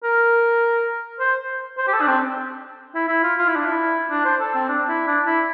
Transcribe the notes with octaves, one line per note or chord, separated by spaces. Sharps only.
A#4
C5
C5
G4
A4
D4
C4
E4
E4
F4
F4
E4
D4
E4
D4
C5
A4
C4
D4
E4
D4
E4